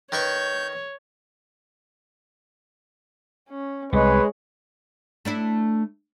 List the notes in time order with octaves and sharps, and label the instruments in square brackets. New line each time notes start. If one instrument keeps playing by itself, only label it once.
[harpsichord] D#3 B4 C#6 [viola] C#5 [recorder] G6
[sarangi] C#4
[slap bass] C2 [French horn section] G#3 [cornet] B4 [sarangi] C#5
[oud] A3 D4 E4